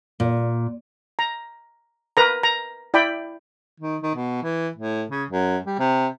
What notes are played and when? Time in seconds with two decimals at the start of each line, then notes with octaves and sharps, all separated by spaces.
0.20 A#2
1.19 A#5
2.17 A#4 B4 A#5
2.43 A#5
2.94 E4 D5 G5 B5
3.80 D#3
4.03 D#3
4.15 B2
4.43 E3
4.76 A2
5.10 C#3
5.30 F#2
5.66 G3
5.79 C3